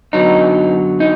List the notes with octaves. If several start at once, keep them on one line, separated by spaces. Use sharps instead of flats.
F#2 D3 F#3 B3 D#4
D#4